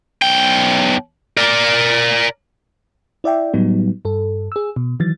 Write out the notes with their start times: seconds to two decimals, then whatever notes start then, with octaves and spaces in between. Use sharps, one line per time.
0.22 B1 G5
1.37 A#4 D5
3.24 E4 D5 E5 G5
3.53 A2 F#3 G3 B3 D#4
4.05 G2 A4
4.52 G#4 E6
4.76 B2
5.00 D#3 E3 F#3 A6